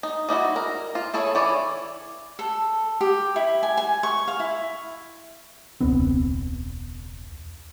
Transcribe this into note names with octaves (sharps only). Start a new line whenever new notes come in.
D#4
G3 D#4 E4 F#4
A#4
F4
E4 G#4 A4 C#5
E3 C#5 D5
A4
G4
E4
G#5
G#5
C#6
F5
E4
E1 C#2 B3 C4